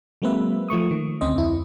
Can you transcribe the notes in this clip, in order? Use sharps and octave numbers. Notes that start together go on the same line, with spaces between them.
F#3 G#3 A#3 C4 B4 E5
F3 A3 C#6 D#6
D#3
D2 C4 C#4 C5 D#5
F2 E4